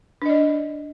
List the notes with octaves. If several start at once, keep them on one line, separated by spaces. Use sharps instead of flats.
D4 D5 D#5